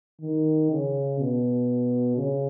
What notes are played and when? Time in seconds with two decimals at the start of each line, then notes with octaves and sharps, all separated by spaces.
0.21 D#3
0.71 C#3
1.19 B2
2.17 C#3